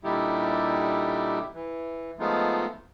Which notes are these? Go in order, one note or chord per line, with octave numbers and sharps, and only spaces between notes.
A#2 D3 G3 D#4 E4 G4
E3
F3 G#3 A3 B3 D#4 F4